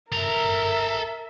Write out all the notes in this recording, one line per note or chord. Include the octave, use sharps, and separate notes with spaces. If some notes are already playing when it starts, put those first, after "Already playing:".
A4 A#4 E5 A#5